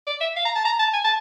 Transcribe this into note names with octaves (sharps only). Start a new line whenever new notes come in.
D5
E5
F5
A#5
A5
A#5
A5
G#5
A5